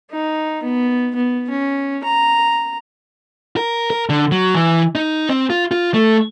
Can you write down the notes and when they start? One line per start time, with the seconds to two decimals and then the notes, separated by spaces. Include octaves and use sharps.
0.10 D#4
0.63 B3
1.15 B3
1.50 C#4
2.04 A#5
3.57 A#4
3.90 A#4
4.09 D3
4.32 F#3
4.55 E3
4.95 D#4
5.29 C4
5.50 F4
5.71 F4
5.94 A3